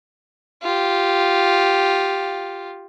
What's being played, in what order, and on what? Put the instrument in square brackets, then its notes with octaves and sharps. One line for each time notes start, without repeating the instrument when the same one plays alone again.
[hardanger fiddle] F4 G4